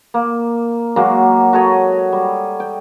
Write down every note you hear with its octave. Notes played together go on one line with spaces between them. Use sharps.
A#3
F#3 G#3 A#3 F#4
F#4 A4 C#5 D#5
G3
G5